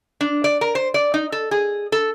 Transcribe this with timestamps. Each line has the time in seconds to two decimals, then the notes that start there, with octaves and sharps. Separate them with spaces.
0.21 D4
0.44 D5
0.61 A#4
0.75 C5
0.94 D5
1.14 D#4
1.32 A4
1.51 G#4
1.92 A4